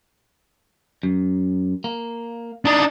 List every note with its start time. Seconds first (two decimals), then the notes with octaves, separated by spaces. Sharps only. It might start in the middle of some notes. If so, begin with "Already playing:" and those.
1.03 F#2
1.84 A#3
2.65 D4 D#4